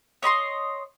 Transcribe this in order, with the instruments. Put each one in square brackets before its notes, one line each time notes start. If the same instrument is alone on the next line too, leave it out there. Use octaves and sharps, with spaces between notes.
[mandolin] C#5 D#5 B5 C6